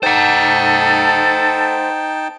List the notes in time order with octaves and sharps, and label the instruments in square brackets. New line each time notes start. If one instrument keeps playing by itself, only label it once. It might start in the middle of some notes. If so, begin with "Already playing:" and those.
[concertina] D#4 G5 A5 [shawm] A4 [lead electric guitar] C5 F#5